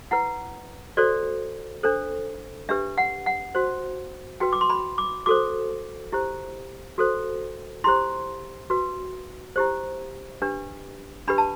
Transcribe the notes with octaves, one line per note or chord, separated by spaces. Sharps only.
E4 B4 F#5
F#4 A4 C5 D5
D4 A4 C5
D4 G4 B4 E5
F#5
F#5
F#4 C5
F#4 B4 G5
D6
C6
B5
D6
F#4 A4 C5 D6
E4 G4 C5
F#4 A4 C5
E4 G4 C5 C6
F#4 B4
E4 G4 C5
D4 G4 B4
D4 G4 B4 B5
A5